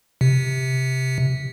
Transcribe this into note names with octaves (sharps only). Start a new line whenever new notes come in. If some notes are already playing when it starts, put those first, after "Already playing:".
C3